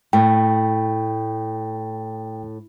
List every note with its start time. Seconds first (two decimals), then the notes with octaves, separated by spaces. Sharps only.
0.13 A2 G5